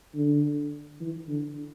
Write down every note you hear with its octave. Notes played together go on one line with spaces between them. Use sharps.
D3
E3
D3